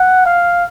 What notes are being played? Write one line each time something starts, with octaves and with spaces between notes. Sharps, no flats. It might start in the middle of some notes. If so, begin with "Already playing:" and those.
Already playing: F#5
F5